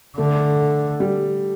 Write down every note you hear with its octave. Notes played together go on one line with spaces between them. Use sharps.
D3 A3
G3